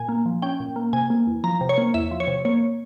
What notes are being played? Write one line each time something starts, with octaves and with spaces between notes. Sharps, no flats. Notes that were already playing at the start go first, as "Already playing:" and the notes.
Already playing: A#2 G#5
A#3
F3
C#4 G5
A#2
A#3
C3 G#5
A#3
E2
F3 A#5
C3
C#5
A#3
E2 E5
F3
C#5
C3
A#3 C#5